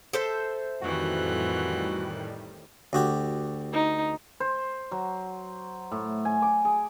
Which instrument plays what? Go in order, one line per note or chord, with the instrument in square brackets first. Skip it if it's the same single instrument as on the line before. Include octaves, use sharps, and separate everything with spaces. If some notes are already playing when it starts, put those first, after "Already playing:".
[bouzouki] A4 C5 E5
[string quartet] F2 E3 F#6 [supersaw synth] A2 D#3 G3 [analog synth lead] F#4
[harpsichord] D2 F#4 G4
[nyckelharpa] D#4
[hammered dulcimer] C5
F#3
A2
G#5
D6
G#4